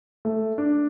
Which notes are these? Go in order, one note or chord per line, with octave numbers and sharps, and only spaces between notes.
A3
D4